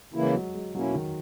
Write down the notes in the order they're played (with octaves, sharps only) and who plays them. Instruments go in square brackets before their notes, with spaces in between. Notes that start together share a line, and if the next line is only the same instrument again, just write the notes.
[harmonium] C#3 E3 A#3 E4
[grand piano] G#3
F#3
G#3
[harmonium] B2 A#3 C#4 E4 [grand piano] F#3
[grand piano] D#3